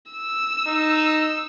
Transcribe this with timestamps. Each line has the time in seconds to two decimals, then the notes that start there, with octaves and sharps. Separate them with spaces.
0.11 E6
0.66 D#4